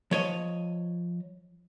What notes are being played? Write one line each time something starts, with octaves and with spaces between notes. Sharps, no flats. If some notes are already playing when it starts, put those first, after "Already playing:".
F3 C#5 D#5